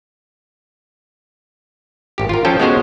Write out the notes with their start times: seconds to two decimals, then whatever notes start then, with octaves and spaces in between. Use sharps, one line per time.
2.18 G#1 G4
2.29 F4 A#4
2.45 F3 C#4 F4 A4 G5
2.60 G#3 B3 C#4 F#4 G#4 C5